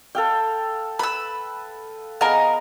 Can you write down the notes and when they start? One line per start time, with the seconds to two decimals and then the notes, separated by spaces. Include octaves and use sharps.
0.15 A4 F5 G5
0.99 B4 B5 E6
2.21 B3 G#4 A#4 D#5 F5